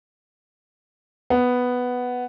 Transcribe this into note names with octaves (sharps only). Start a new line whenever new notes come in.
B3